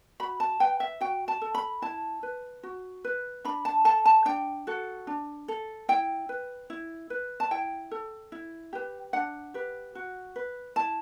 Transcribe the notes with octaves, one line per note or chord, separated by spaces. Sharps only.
F#4 B5
A5
B4 G5
E5
F#4 G5
A5
A4
B5
E4 A5
B4
F#4
B4
D4 B5
A5
A4 A5
A5
D4 G5
F#4 A4
D4
A4
E4 G5
B4
E4
B4
A5
E4 G5
A4
E4
G4 B4
D4 F#5
G4 B4
F#4
B4
E4 A5